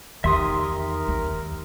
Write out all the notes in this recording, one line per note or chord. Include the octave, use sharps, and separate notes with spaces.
E2 D#3 G4 A#4 E5 C6 D#6
D#2